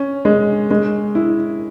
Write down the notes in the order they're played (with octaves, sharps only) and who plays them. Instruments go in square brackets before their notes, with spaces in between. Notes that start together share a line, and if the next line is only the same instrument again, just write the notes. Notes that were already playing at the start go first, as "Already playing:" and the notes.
Already playing: [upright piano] C#4
G#3
G#3
E4